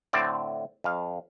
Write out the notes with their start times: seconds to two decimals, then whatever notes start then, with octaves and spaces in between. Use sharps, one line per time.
0.13 A2 D3 C4 D5
0.84 F2 F5